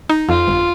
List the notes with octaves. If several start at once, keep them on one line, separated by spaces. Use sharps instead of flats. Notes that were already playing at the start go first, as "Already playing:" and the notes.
D#4
F2 F4
G1